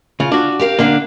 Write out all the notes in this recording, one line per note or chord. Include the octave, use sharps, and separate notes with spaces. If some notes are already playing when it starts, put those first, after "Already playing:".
C#3 F4
D4 F#4
G4 A#4 F5
D3 A#3 D4 F5